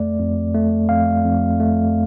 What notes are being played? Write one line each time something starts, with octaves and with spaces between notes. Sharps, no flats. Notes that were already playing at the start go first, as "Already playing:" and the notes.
Already playing: F2 A3 D5
F2
A3
F2 F5
F2
A3